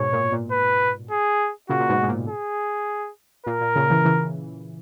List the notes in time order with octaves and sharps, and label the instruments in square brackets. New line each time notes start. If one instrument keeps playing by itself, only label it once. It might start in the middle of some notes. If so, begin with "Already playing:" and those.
Already playing: [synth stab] G#2 B2 [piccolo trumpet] C#5
[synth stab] A#2
A#2
[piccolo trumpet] B4
G#4
[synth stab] A#2 C#3 [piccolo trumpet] F#4
[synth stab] A#2
G#2 B2
G#2
A#2
[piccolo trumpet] G#4
[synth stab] A#2 [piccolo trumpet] A#4
[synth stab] A#2
A#2 C#3
C#3 E3
C#3 E3